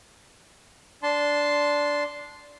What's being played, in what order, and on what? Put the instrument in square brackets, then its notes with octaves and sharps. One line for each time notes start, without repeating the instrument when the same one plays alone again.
[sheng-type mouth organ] D4 A5 C6